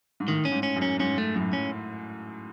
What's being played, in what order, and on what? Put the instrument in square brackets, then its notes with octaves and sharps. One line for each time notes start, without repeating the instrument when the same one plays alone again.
[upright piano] G#2
[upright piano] A2 [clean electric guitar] D#3
[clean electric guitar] C#4
[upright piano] G#2
[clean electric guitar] C#4
[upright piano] F#2
[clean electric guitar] C#4
[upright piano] G#2 [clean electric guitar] C#4
[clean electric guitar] A3
[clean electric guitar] F#2 [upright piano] A2
[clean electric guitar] C#4